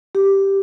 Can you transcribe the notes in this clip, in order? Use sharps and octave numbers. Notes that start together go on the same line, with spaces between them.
G4